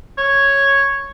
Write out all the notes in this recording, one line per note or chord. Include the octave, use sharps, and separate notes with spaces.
C#5